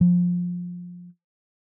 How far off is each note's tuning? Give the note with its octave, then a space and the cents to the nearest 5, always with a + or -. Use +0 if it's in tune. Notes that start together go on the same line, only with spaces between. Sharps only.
F3 +20